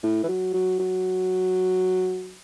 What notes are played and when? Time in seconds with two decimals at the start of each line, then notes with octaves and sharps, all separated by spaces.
0.03 A2
0.24 E3
0.28 F#3
0.54 F#3
0.79 F#3